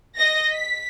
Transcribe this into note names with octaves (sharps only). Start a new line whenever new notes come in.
D#5 A#6
B6